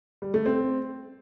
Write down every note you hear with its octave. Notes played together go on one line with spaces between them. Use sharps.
G3
A3
C4